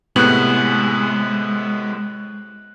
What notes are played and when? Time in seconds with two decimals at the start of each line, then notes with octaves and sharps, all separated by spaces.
0.16 A2 C3 G#3 B3 F#6 F#7